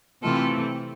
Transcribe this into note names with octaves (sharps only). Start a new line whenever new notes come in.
C3 E3 A3 C4 F4 A4